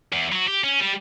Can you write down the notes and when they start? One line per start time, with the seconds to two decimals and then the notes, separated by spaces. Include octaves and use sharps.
0.12 E2
0.32 F#3 F#4
0.48 G4
0.63 C#4
0.80 G3